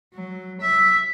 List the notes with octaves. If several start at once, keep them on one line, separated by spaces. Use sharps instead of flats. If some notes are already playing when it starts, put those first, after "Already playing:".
F#3
E5